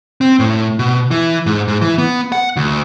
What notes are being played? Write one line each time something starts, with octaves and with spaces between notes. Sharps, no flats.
C4
A2
B2
E3
G#2
G#2
E3
B3
F#5
D2